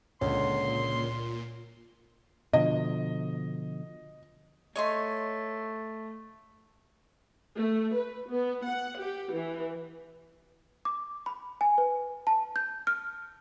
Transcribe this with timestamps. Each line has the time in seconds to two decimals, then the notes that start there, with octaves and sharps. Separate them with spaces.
0.21 C#2 A#2 D3 C#5 C6
2.53 B2 D3 F3 D#5
4.76 A3 C#5 D#5 C6
7.56 A3
7.95 B4
8.30 B3
8.65 F#5
9.00 G4
9.33 E3
10.85 D6
11.26 B5
11.61 G#5
11.78 B4
12.27 A5
12.56 G6
12.87 F6